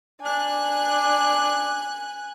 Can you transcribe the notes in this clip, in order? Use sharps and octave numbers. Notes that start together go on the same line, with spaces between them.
D4 G#5 F#6